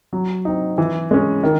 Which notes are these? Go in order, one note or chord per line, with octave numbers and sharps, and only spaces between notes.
F#3
C4 D#4
E3
G#3 C#4
D#3